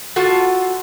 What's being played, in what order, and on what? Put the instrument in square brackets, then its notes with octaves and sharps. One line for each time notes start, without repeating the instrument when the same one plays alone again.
[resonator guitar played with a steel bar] F4 F#4 A4